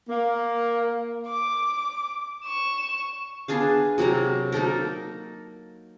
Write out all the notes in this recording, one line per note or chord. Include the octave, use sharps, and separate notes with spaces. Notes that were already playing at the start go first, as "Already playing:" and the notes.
A#3
D6
C#6 E7
B3 D4 G#4 F5
C3 F#3 A#3 A#5
A#3 D#4 A4 A#4